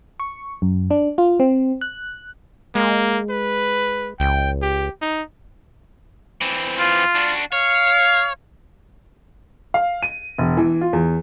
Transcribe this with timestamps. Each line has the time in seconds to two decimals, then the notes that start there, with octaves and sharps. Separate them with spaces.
0.20 C#6
0.62 F#2
0.91 D4
1.18 F4
1.40 C4
1.81 F#6
2.75 G#3 A#3
3.30 B4
4.20 C#2 G5
4.62 G4
5.02 D#4
6.41 E3 C4
6.79 F4
7.15 D4 F#4
7.53 C#5 F5
9.74 F5
10.03 D#7
10.38 E1
10.57 E3
10.81 F4
10.93 E2